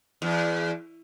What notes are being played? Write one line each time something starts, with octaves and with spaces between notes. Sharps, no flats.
E2